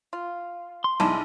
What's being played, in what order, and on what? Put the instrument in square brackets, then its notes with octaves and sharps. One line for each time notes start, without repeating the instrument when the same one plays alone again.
[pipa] F4
[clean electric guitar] C6
[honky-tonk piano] B1 [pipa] G#3 D4 E4